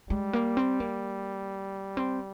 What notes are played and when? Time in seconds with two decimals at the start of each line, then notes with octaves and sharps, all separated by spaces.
0.10 G3 G#3
0.33 A#3
0.57 C4
0.80 A#3
1.97 C4